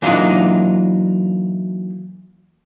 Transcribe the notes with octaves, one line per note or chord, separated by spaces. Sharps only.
E3 F#3 A#3 D4 D#4 F4